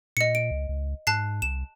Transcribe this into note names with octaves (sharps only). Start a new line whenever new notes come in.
A#2 D#5 C#7
D7
C#2
C#2
G#2 A5 F#6 C7
C2 E7